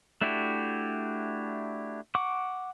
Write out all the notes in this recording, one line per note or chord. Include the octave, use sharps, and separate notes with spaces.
A3 D4 E4 F#4 G4
F#5 C#6 D6